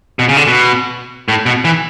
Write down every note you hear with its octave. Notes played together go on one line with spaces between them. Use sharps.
B2
C#3
D3
B2
A2
B2
E3